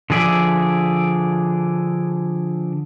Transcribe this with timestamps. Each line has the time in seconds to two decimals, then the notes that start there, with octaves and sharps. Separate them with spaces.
0.10 D3 F3 G#4 D5 E5